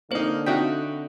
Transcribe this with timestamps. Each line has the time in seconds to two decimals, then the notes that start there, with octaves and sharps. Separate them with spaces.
0.11 D3 A#3 C4 D#4 C5
0.46 C4 D#4 F#4 E5 G5 B6